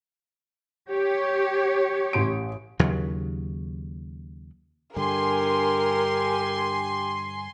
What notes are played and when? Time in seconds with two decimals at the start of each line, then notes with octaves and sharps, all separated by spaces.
0.89 G4 C#5
2.13 A1 C6 D7
2.79 D#2 C#3 F#3
4.96 G2 D3 G4 A#4 G#5 C6